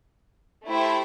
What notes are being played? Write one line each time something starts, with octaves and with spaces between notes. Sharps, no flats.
A3 E4 G4 C5 G5